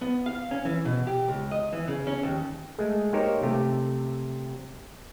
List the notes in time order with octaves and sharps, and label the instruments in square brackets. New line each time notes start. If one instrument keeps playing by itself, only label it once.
[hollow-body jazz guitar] B3
F5
C#4
E3
B2
G4
C#2
D#5
E3
C#3
C#4
D#2
[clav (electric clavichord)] G#3 A3 G#4
A#3 D#4 G4 A#4 C5 C#5
C3 A3 G4